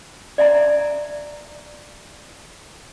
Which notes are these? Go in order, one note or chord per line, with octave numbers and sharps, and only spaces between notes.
D5 E5 G#5 A#5